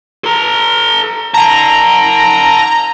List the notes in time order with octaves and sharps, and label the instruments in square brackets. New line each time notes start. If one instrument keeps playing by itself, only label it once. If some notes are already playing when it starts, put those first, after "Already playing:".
[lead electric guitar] A4 A#5
[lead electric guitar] F#5 A5 [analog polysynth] A#5